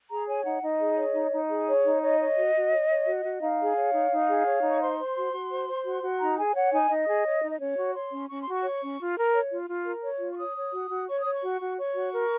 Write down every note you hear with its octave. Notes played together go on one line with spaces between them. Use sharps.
G#4 A#5
C#5 G#5
D#4 F#5
D#4 D#5
G#4
C#5
D#4
D#4
G#4
C#5
D#4
C#5 D#5
C#5
F#4
F#4
C#5
C#5
F#4
F#4
D#4 F5
G#4
C#5
D#4
D#4
G#4
C#5
D#4
C#6
C5 C6
C5
F#4
F#4
C5
C5
F#4
F#4
D#4 A#5
G#4 G#5
C#5 F#5
D#4 G#5
D#4 D#5
G#4
C#5
D#4
D#5
C#4 C#5
F#4
C#5 C6
C#4
C#4 C#6
C6
F#4
C#6
C#5
C#4
F4
A#4
C#5
F4
F4
A#4
C#5
F4
C#6
C#5 D#6
C#5
F#4
F#4
C#5 C#6
C#5 D#6
C#6
F#4
F#4
C#5 C#6
F#4
A#4